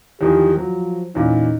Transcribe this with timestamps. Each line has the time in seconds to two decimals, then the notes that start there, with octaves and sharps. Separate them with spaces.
0.21 E2 D#3 F3 G4
0.57 F3 F#3
1.15 E2 A#2 C#4 D#4